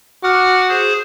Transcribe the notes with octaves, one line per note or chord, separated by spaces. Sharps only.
F#4 F#5 D6 F6
G#4 C5